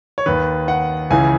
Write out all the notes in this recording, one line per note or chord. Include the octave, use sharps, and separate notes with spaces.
C#5
D#2 D#3 B4
F#5
C#2 C#3 E3 G#5